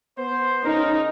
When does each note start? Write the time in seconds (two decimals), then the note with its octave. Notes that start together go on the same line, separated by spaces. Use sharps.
0.19 B3 C5
0.65 C#3 D#4 A#4